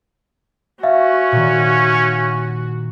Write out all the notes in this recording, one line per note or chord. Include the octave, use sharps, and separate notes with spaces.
C#4 F#4 E5 F5
A#2 D#3